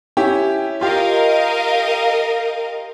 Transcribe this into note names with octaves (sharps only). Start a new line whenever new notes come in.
C#4 E4 G4
F4 G4 A#4 D#5 F5